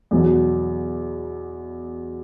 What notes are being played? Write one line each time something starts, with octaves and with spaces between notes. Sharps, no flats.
E2 B2 F#3